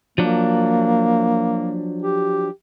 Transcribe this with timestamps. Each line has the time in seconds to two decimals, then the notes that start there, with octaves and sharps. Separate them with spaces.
0.18 F3 F#3 A#3 D4
2.02 G4